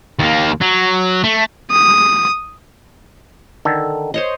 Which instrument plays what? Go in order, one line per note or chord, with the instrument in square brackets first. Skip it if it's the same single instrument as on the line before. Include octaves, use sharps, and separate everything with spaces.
[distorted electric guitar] D#2 A#3
F#3
A3
[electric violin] D#6
[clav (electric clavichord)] D3 D#3 A4
[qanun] C5 C#5 D#5